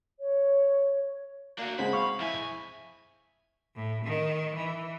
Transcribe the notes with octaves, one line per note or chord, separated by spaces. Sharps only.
C#5
A#3 D4 F#4
F#3 G#3 C4 B5
F5 C#6
F2 E4 G#5
A2
D#3
E3